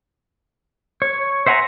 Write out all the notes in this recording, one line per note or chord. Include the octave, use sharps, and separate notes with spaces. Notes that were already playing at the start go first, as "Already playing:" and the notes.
C#5
C5 E5 F#5 G#5 A#5